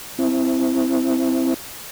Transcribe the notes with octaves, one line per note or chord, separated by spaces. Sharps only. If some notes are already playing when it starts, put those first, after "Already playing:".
C4 E4